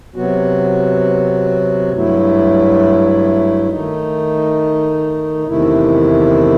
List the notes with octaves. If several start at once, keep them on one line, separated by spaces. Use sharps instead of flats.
C3 F#3 B3 F#4
G2 F#3 A3 E4
D#3 A3 D#4
E2 C3 D#3 A3 E4